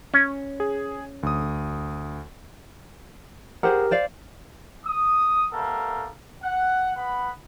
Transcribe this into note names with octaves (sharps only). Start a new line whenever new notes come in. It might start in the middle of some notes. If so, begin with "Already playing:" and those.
C#4
G#4
D2 D#6
G4 G#4 A#4 C5 F#5
C5 D5 F5
D#6
G3 A3 B3 A4 A#4 F5
F#5
B3 F#5 B5